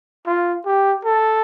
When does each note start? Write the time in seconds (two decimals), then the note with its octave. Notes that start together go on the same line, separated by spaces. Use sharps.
0.27 F4
0.66 G4
1.04 A4